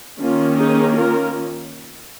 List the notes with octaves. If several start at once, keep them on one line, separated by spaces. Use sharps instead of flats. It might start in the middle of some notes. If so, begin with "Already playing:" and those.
D#3 A#3 C#4 F4
D#4 G#4
F4 A#4